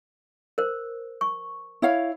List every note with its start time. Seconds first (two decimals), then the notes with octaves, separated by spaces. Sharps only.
0.58 A#4 C5
1.21 C#6
1.82 E4 C#5 F5